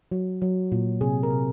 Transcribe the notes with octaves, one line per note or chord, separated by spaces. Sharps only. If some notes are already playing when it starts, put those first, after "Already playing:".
F#3
F#3
A#2
C3 G#4
A#4
C3